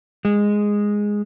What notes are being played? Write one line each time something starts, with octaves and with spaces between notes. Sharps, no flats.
G#3